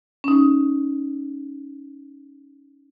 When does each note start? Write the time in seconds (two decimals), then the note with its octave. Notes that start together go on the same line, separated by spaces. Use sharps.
0.24 C#4 D#4